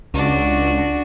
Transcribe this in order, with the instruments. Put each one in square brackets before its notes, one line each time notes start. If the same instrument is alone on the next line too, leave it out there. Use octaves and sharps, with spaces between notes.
[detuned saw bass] C#2 [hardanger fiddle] D4 F#4